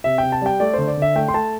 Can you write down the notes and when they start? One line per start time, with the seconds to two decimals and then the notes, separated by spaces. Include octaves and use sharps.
0.04 C3 E5
0.18 C3 G5
0.32 A5
0.42 G3 G5
0.60 A3 D5
0.74 D3 C5
0.88 D5
0.97 D3 E5
1.16 A3 G5
1.28 C6
1.34 A3 A5